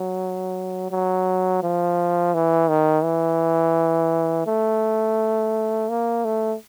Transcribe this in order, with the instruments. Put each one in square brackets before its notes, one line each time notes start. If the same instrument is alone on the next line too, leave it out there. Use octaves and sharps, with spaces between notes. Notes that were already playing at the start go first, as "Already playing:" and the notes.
Already playing: [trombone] F#3
F#3
F3
E3
D#3
E3
A3
A#3
A3